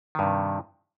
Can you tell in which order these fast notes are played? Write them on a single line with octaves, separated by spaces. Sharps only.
D#3 G2 C3